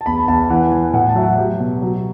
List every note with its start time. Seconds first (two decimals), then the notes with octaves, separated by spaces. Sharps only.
0.01 A5
0.06 E2 B5
0.17 A5
0.28 E2 A5
0.50 E3 F#5
0.72 E3
0.94 A2 F#5
1.09 A5
1.15 F#3 E5
1.23 F#5
1.38 F#3 G4
1.59 B2
1.82 F#3